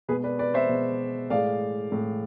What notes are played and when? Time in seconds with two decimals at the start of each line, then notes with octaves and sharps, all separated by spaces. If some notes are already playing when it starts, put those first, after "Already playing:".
0.08 B2 G#4 B4
0.11 G#3
0.24 B4 D5
0.39 B4 D5
0.54 C5 E5
0.69 B2 G#3
1.30 A2 G#3 D5 F5
1.92 A2 G#3